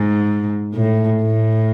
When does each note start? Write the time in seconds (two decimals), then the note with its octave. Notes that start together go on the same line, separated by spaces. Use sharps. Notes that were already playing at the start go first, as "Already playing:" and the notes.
Already playing: G#2
0.75 A2
1.22 A2